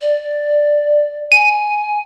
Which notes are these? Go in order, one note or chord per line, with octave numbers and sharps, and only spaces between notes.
D5
G#5 D#7